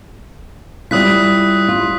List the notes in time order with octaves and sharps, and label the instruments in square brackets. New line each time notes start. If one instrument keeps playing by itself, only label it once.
[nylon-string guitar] G3 E4 F4 [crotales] D#6 F#6 B6
[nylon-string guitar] F4